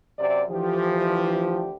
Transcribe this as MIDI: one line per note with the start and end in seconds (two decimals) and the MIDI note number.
0.18 0.43 42
0.18 0.43 48
0.18 0.43 74
0.50 1.75 38
0.50 1.66 52
0.50 1.66 53
0.50 1.75 67